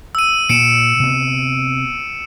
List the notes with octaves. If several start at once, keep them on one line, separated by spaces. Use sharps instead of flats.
E6 D#7
A#2 C#7 D7 E7
C3 B3